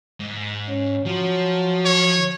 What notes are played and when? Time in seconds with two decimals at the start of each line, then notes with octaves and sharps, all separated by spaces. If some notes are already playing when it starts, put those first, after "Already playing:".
0.20 G#2
0.68 C#4
1.06 F3 F#3
1.85 C#5